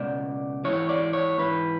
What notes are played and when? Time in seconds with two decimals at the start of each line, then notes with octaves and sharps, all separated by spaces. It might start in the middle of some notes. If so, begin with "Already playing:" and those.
Already playing: C#2 B2 D5
0.64 G#2 E3 C#5
0.89 D5
1.13 C#5
1.38 G#2 E3 B4